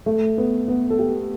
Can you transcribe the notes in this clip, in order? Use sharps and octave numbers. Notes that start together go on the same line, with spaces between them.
A3
B3
B3
A4
G4